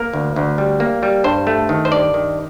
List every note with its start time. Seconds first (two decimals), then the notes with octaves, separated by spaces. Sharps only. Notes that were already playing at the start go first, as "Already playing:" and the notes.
Already playing: A#3 A#4
0.13 D2
0.36 D2
0.58 G3
0.80 A#3
1.03 G3
1.24 G2 C5
1.47 A3
1.69 D#3
1.85 C5
1.91 G2 D5
2.14 D#3